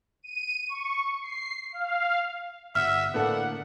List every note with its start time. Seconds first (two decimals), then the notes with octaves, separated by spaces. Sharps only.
0.23 D#7
0.67 C#6
1.22 C7
1.72 F5
2.75 G1 E5 F#5 F6
3.14 A2 D3 A#3 B3 D4 A4 F#5